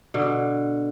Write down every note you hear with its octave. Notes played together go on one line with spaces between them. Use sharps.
B2 D3